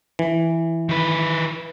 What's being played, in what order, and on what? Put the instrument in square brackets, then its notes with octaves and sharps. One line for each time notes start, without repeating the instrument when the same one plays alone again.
[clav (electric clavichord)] E3
[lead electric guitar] D#3 B4